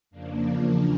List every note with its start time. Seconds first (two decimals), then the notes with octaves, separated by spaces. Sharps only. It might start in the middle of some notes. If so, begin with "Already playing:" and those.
0.11 F2 C#3 F3 A#3 D4
0.47 E2 C#3 F3